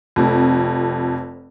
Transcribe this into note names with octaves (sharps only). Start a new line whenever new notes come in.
F1 F2